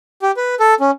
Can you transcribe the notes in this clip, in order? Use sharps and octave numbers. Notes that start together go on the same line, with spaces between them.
G4
B4
A4
C#4